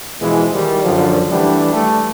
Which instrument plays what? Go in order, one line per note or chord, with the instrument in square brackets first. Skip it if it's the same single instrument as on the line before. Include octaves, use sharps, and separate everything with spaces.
[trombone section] B2 E3 F3 G#3
D#3 G3
F#2 D3 F3
E3 G3 A3 D4
A3